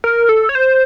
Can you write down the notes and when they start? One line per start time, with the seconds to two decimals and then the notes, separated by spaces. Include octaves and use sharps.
0.04 A#4
0.29 A4
0.49 C#5
0.55 C5